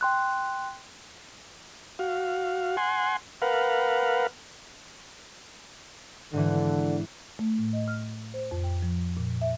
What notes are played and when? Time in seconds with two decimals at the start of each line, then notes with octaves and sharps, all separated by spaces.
0.01 G5 C6 F#6
1.99 F#4 F5
2.77 F#5 G#5 C6
3.42 A#4 B4 F5 F#5
6.33 G#2 D3 E3
7.39 A3
7.59 A2
7.73 D#5
7.88 F6
8.34 C5
8.51 F2
8.64 G5
8.82 F3
9.17 A#2
9.41 E5